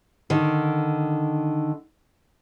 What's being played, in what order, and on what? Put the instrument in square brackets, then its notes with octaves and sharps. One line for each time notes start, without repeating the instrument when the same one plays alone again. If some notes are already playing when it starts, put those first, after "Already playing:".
[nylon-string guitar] D3 D#3